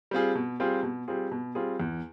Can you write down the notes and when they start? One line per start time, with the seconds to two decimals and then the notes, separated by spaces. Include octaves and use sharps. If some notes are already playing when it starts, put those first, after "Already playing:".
0.11 G3 C4 F4 G#4
0.35 B2
0.60 G3 C4 F4 G#4
0.83 B2
1.08 G3 C4 F4 G#4
1.31 B2
1.55 G3 C4 F4 G#4
1.80 E2